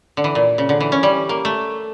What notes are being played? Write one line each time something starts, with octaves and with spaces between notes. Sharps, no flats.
D3
E3
A#2
C#3
D3
E3
C#4
G3
A#3
A3